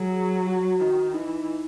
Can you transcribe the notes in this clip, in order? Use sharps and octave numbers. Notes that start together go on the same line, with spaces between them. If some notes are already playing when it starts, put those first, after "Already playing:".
Already playing: F#3 G#4
F#4
D#3
E3 D#4